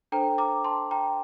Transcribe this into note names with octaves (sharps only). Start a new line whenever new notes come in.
D4 A4 C5 G5 A#5
A#5 D6
A5 C6
G5 A#5